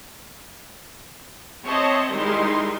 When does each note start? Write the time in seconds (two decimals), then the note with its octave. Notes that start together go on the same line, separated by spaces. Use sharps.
1.65 C4 C5 C#5 D#5 E5 A5
2.10 D#3 G3 G#3 D#4 E4 C6